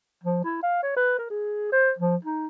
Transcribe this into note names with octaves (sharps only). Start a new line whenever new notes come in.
F3
E4
F5
C#5
B4
A#4
G#4
C5
F3
D#4